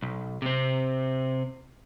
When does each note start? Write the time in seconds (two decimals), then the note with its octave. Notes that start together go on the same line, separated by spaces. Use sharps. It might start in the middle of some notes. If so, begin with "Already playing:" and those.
0.02 B1
0.42 C3 C4